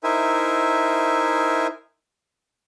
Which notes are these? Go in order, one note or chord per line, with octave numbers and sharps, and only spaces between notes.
D#4 E4 A#4 C5 E5 G#5